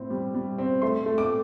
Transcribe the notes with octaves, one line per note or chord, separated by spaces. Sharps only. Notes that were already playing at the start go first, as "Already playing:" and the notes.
Already playing: A2 C4
G3
G3
C4
A3 C6
A3
D6